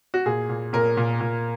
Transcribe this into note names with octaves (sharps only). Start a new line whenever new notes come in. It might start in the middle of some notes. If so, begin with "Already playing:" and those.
F#4
A#2 G#4
A#2
A#2 A#4
A#2
A#2